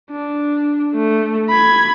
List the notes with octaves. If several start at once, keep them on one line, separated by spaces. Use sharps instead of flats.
D4
A3
B5 G#6